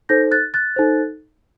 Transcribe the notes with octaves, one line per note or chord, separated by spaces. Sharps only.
D#4 A4 C5 G6 A#6
F#6 A6
F#6 A6
D#4 A4 C5